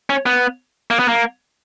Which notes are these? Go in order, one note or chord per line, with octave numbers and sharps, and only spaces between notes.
C#4
B3
A#3
B3
A#3